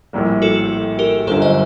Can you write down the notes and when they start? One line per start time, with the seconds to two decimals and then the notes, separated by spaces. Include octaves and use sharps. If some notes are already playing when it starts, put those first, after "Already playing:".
0.13 A#1 A2 G3 A#3
0.42 F#4 A4
0.99 G4 A#4
1.27 G1 F#2 D3 A4 C5
1.42 C5 D#5